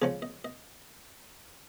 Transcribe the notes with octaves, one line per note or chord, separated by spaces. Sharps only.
C#3 F3 G#3 C#4 G#4
D#5
D#5